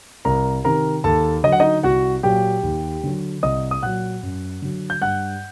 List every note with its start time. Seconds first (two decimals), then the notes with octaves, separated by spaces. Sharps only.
0.25 C2 A#4 A#5
0.64 C3 D#3 A#4 A#5
1.04 D#2 A4 A5
1.44 D3 F#3 D#5
1.52 F#5
1.60 D#4 D#5
1.83 C2 F#4 F#5
2.23 A#2 F#3 G4 G5
2.63 D#2
3.04 D3 F#3
3.43 C2 D#5 D#6
3.71 D#6
3.82 A#2 F#3 F#5 F#6
4.23 F#2
4.62 D3 F#3
4.90 G6
5.01 G2 F#5 F#6